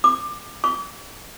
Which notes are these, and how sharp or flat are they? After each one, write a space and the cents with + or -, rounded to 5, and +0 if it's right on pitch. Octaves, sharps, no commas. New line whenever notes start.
D6 +20
D6 -45